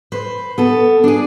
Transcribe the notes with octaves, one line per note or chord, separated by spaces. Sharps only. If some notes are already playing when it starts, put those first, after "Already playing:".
B4 C5
B3 A4
D4 G#4